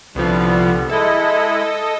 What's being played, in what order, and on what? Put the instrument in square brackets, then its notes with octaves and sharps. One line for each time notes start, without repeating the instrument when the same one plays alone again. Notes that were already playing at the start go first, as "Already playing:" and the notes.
[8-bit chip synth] C2 F3 [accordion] D3 G3 B3
[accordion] G#3 E4 [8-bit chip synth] A4 D#5